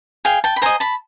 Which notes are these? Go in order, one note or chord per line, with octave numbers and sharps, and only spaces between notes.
G#4 F5 G5
G5 A5
B5
C5 D#5 G#5 A#5
A5 B5